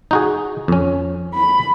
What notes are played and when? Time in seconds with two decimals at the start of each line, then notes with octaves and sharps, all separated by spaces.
0.11 D#4 F#4 G#4
0.68 F2 C#4
1.34 B5